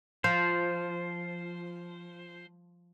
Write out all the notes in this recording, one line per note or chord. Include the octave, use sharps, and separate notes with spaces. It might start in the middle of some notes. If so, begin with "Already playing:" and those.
F3 C5